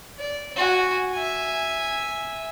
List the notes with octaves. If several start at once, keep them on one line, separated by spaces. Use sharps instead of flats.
D5
F#4 G#5
E5 G#5